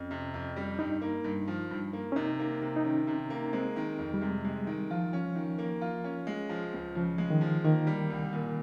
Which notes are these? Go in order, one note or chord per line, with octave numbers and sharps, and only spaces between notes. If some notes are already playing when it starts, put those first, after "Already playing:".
Already playing: F2 C#4
C3
F2
G3
G2 D#4
A#3
G2
F3
G2
A#3
C#4
C3 D#4
A#3
C3
D#4
D#3 C#4
C3
A#3
G#3 C4
D#3
F2
G3
C3 G#3
G#3
D#3
F3 F4
C#4
D#3
A#3
F4
C#4
G#3
F3
C#2
C#3 F3
G#3
D#3
F3
D#3 A#3
G3
C2
A#2